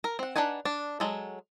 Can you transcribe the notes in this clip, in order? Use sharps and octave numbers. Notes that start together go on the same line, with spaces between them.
A#4
C4 F#5
D4 D#4 B4 F#5 G#5
D4
F#3 G#3 A4